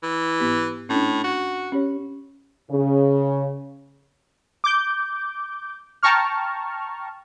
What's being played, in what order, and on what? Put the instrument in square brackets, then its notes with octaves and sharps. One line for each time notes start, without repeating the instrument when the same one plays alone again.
[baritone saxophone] E3
[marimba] G#2 B3 G4
[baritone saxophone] A2 [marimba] C#4 D4
[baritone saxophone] F#4
[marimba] C#4 G4 C#5
[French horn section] C#3
[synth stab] D6 G6
G5 A5 A#5 C#6 F6